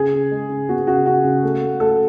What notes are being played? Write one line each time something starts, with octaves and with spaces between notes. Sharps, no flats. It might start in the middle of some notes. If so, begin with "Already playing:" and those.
Already playing: C#3 G#4
C#3
G#3
C#3
B3 F#4
C#3 F#4
C#3 F#4
C#3
A3
A3
A3 A4